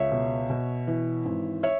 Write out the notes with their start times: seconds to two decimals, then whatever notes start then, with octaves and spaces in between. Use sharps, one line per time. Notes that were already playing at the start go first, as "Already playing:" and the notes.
Already playing: C#2 C#5 E5
0.12 B2
0.50 B2
0.87 E3
1.25 G#1
1.63 C#5 E5